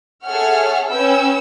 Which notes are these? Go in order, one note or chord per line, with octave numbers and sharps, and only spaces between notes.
G#4 A4 C#5 E5 F#5 F6
C#4 B4 G5 E6